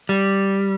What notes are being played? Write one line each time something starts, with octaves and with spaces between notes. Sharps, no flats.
G3